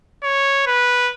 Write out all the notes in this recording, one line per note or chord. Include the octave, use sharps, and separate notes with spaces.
C#5
B4